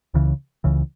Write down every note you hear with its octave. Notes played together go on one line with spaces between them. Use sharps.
C#2 C#3 E3
C#2 C#3 E3